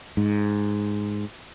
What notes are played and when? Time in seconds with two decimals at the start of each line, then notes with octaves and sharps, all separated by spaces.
0.17 G#2